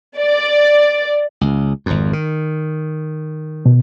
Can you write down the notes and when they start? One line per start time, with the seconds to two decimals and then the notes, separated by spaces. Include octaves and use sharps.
0.18 D5
1.41 C#2
1.86 G#1 F2
2.13 D#3
3.66 B2